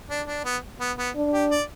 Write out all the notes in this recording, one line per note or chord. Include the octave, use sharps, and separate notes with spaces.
D4
D4
B3
B3
B3
D4
G4
D5